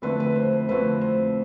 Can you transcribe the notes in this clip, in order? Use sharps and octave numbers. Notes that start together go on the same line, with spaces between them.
F2 D3 A3 C4 E4 B4
B4
C5
C5
F2 D3 A3 C4 E4 B4
C5